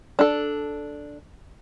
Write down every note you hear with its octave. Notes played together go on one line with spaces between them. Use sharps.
D4 A4